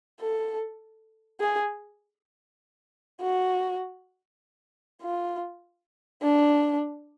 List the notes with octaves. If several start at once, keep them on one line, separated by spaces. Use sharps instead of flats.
A4
G#4
F#4
F4
D4